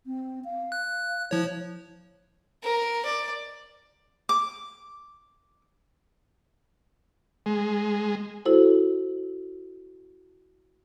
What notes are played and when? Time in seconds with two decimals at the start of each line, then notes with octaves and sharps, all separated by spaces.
0.06 C4
0.45 F5
0.72 F#6
1.31 F3 E4 C#5
2.64 A#4
3.05 D5
4.29 D6
7.46 G#3
8.45 E4 F#4 A4 C5